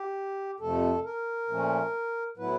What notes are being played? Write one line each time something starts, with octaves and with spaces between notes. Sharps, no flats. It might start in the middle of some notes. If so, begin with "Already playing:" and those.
Already playing: G4
F2 C3 F3 A3 A4
A#4
A#2 F3 A3 C#4
A2 F#3 B3 E4 B4